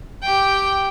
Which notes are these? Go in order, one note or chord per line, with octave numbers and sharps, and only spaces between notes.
G4 G5